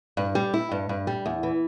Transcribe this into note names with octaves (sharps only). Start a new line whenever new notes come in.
G2
G3
E4
G2
G2
G3
E2
E3